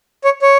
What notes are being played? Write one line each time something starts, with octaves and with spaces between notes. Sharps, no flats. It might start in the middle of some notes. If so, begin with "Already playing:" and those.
C#5
C#5